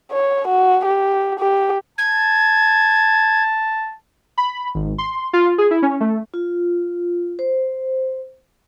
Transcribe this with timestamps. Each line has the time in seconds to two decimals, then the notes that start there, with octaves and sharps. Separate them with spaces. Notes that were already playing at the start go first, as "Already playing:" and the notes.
0.11 C#5
0.47 F#4
0.86 G4
1.39 G4
1.98 A5 G#6
4.38 B5
4.75 G#1
4.98 C6
5.33 F4
5.58 G#4
5.71 E4
5.82 C#4
6.00 A3
6.34 F4
7.39 C5